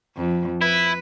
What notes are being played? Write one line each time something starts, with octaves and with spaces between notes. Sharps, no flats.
F2
E4 B4